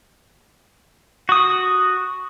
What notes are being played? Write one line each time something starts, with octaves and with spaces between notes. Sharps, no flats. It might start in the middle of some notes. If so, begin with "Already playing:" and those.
F#4 D#6